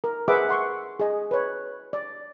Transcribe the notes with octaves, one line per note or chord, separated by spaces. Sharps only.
A#4
G#4 B4 C5 E5 F#5 D6
F#5 C6 C#6
G#4 D#5
B4 C#5
D5